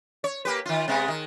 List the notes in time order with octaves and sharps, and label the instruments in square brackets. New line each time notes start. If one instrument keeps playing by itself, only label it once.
[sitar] C#5
A#3 G4 B4
D#3 F4
C3 G#3 B3
D#3